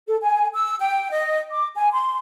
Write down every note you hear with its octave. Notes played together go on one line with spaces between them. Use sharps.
A4
G#5
E6
G5
D#5
D6
G#5
C6